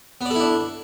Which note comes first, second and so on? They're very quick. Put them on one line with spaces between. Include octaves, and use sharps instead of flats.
B3 D5 A4 E4 D4